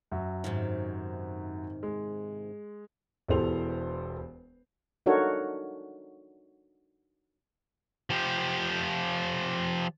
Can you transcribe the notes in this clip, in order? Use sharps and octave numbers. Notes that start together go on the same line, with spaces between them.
F#2 F#4 E5
G#2 C3 D#3
G#3
E1 E2 G4 A4 C5 F7
D4 D#4 F#4 A4 A#4 C#5
F3 G4